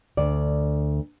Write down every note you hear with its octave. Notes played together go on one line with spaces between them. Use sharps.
D2 D5